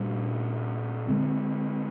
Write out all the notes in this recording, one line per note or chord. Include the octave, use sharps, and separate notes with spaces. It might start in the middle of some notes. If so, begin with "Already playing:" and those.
Already playing: A#2 G3 D4
D3 G#3 C4